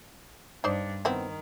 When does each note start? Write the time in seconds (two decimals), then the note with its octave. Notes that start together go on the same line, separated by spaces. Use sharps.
0.64 G2 D4 D#4 C5 D5
1.05 D#3 B3 C4 E4